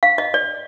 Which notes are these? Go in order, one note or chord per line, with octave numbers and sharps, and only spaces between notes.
F5
D#5
D5